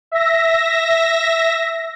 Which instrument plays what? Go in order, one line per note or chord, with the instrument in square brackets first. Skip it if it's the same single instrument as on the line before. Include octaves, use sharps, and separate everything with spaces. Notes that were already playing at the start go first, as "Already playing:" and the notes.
[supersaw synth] E5 A#6